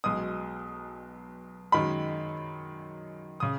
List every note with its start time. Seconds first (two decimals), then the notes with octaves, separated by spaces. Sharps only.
0.04 B1 B2 G#3 D#6
1.72 F#2 D#3 G#3 B5
3.40 C#3 D#6